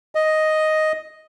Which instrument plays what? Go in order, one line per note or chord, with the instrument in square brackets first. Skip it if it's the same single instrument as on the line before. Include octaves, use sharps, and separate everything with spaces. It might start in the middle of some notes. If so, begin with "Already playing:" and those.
[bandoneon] D#5